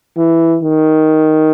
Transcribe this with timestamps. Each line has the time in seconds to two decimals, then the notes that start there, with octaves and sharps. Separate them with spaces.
0.17 E3
0.63 D#3